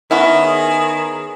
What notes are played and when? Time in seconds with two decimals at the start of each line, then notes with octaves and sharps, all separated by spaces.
0.11 D#3 B3 C#4 E4
0.44 G#4